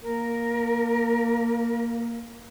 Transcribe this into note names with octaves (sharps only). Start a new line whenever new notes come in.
A#3 A#4